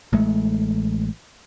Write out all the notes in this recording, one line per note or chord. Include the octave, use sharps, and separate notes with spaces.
A1 G#3 A3